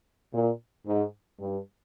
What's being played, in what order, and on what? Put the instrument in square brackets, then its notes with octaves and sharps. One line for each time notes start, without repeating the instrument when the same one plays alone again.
[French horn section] A#2
G#2
G2